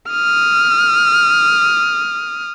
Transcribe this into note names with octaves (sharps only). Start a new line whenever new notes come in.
D#6 F6